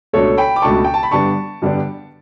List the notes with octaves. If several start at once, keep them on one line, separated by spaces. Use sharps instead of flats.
C#2 B2 A3 D4 A4 C#5
G5 B5
D6
C#2 B2 A3 D4 A5 C#6
G5
A5
B5
G2 D3 G3 B3 D4 A5 C#6
G2 D3 G3 B3 D4